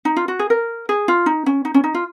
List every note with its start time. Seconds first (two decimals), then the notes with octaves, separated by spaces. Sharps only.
0.05 D#4
0.17 F4
0.28 F#4
0.39 G#4
0.50 A#4
0.89 G#4
1.08 F4
1.26 D#4
1.46 C#4
1.65 D#4
1.74 C#4
1.84 D#4
1.94 F4